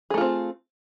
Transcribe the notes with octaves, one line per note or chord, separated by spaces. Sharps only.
A3 C4 F4 G#4